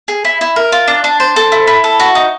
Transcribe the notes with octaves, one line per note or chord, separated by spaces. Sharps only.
G#4
E4
E4
A#4
F4
D4
D4
C5
A4
E4
E4
A4
F#4
D#4